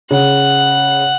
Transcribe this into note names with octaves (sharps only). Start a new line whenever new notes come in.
C#3 F#5